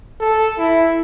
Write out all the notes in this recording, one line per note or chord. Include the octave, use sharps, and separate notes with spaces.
A4
E4